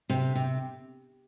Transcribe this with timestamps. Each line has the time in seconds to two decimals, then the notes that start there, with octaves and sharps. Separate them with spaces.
0.10 C3
0.35 C3